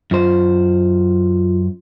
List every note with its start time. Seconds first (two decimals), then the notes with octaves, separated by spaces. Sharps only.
0.11 F#2 F4 C5